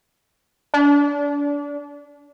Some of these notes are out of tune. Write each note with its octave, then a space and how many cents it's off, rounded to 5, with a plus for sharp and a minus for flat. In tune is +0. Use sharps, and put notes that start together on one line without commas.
D4 -30